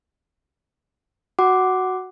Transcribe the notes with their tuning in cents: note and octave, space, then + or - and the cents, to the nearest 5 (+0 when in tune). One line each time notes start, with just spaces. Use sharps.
F#4 +0 F#5 +10 D6 +0